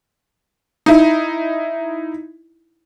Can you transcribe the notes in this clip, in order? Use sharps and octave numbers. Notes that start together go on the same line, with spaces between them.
D#4 E4